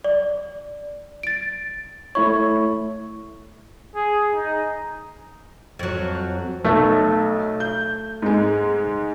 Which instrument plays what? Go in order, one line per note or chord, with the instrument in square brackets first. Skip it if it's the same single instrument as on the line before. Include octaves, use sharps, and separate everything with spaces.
[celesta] D5
A6 D7
[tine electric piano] A3 E4 C#5 [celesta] C#6
[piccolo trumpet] G#4
D#4
[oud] F2 F#3
[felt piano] B1 [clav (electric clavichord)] A3
[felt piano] G6
G#2 G#3